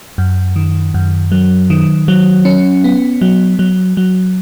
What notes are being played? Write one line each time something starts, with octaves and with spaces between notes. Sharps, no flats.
F#2
D#3
F#2
F#3
D#3
F#3
C#4
B3
F#3
F#3
F#3